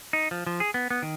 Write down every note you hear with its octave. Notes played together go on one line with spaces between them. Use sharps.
D#4
F3
F3
G#4
B3
B3
D#3